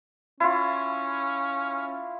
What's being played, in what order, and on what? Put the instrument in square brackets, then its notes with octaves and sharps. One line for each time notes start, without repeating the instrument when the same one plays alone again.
[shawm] C#4 [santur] E4 F4